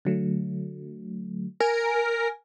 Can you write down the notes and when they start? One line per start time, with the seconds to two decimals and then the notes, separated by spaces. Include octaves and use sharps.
0.05 D3 F#3 A3
1.60 A#4 G#5